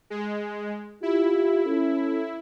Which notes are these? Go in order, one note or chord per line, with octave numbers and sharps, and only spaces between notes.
G#3
E4 F4 G4
C#4 A4